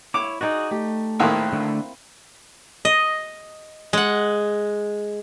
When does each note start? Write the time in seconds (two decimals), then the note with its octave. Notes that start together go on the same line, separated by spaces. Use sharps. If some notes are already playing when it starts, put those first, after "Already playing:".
0.14 E4 C#5 D6
0.41 D#4 F#4 G#4 D5 D#5 D#6
0.71 A3 G4
1.20 A#1 A2 D#3 A#3 C4 E4
1.52 D3 A3
2.85 D#5
3.93 G#3 F#5